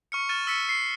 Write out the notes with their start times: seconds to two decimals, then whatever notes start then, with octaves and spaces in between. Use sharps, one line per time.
0.12 C#6 F6 C#7
0.29 F6 A6 D#7 E7
0.47 E6 B6 C#7
0.69 C7